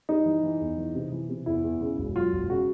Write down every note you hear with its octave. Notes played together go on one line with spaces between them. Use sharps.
G3 D#4
E3
E3
E2
E3
C3
E3
C3
E2 E4
E2
C#3
E1
F#3 F4
E1
C#3 F#4